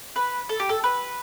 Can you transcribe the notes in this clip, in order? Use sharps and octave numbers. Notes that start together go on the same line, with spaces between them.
B4
A4
G4
A4
B4